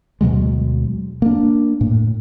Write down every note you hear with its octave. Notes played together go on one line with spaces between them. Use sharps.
D2 B2 F#3 G#3
A#3 D4
A2